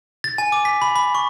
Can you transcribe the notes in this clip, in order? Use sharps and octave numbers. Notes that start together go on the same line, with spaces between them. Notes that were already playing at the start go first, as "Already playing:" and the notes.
A6
G#5
D6
B6
B5
B5
C#6